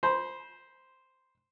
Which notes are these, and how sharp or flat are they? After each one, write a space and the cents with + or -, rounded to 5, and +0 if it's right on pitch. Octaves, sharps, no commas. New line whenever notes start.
C5 +0 B5 -35